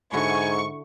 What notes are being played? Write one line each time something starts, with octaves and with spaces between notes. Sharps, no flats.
G#2 D3 E4 F#4 G#5 C#6